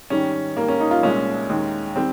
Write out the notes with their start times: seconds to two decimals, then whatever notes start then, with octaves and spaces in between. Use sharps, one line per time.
0.10 G#2 D#3 G3 C#4
0.57 G#2 G3 A#3
0.68 C#4
0.80 D#4
0.91 F4
1.03 C2 A#2 G#3 C#4
1.49 D#2 D#3 G#3
1.96 D#3 G3 C4